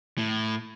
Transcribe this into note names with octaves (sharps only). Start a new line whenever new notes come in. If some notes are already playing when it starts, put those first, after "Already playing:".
A2